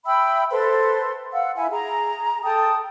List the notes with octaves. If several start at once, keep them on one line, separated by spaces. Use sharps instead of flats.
E5 G5 B5 E6
A4 B4 C5 C6
F5 F#5 E6
E4 E5 G#5
G#4 A#5
A4 G5 A5 D#6